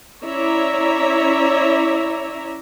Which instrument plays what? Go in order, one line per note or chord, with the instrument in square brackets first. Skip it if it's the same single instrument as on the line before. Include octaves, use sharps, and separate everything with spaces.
[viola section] C#4 E4 C#5 D5 E5 A#5